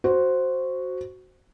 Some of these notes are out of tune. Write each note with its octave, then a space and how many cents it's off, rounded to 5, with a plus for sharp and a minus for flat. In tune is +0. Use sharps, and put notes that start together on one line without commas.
F#4 +0 C5 +0